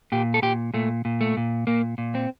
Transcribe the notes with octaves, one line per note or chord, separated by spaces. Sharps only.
A#2 G4
A4
A#2 G4
A#2 A3
A#2
A3
A#2
A#2 A#3
A#2
C4